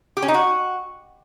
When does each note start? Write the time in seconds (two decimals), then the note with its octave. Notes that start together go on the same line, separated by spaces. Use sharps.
0.17 G4
0.23 C#4
0.28 D#4
0.34 F#4